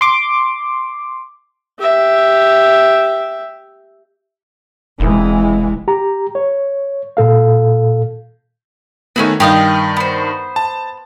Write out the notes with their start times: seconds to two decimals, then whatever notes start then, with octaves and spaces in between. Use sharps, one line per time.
0.01 C6 D6
1.80 G4 E5
5.00 E1 C3 E3 G#3
5.88 G4 A#5
6.35 C#5
7.17 A#2 A4 F5
9.16 D#3 A3 B3 C#4 E4 F#4
9.40 G2 D#3 G4 D#5 F5
9.97 B3 C5
10.56 A5